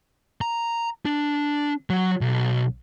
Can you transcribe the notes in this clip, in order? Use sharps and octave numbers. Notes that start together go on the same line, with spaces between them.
A#5
D4
F#3
B1